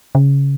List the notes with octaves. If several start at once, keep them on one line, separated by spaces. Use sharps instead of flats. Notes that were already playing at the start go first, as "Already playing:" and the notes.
C#3